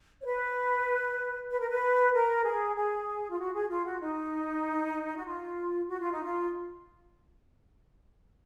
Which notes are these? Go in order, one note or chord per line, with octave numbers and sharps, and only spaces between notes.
C#5
B4
B4
A#4
B4
A#4
G#4
G#4
F4
F#4
G#4
F4
F#4
D#4
F#4
F4
F#4
F4
D#4
F4